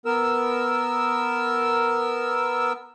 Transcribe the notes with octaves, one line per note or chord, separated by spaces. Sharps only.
B3 A#4 E6